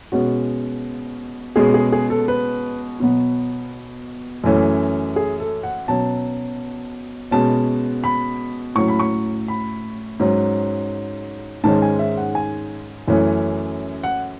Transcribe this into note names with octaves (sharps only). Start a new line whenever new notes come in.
B2 G#3 C#4 F#4
B2 G#3 C#4 G#4
G#4
G#4
A4
B4
B2 F#3 B3
F#2 E3 A3 C#4
G#4
A4
F#5
B2 F#3 C#4 A5
B2 G#3 C#4 A5
B5
A2 F#3 C#4 C#6
B5
C#6
B5
G#2 F#3 C#4
G#2 D#3 G#3 C#4 A5
G#5
E5
F#5
G#5
F#2 E3 A3 C#4
F#5